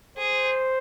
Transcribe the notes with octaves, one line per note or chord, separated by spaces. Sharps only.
G#4 C5